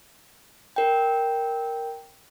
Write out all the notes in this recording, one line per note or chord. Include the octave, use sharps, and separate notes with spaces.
A#4 G5